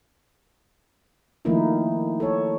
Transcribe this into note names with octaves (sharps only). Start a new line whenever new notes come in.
D#3 F3 A3 A#3 D#4 E4
A4 C#5